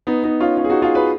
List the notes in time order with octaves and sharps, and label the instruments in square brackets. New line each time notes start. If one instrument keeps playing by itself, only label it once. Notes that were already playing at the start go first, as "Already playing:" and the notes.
[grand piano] B3 D#4
B3 D#4
C#4 F4
C#4 F4
G#4
D#4 F#4
F4 G#4
G#4 B4